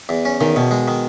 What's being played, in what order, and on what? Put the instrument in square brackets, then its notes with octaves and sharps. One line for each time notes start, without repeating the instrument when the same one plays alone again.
[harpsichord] E2
C#4
[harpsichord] E2 [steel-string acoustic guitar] D#3
[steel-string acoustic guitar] B2 [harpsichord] D#3
[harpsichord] G#3
D#3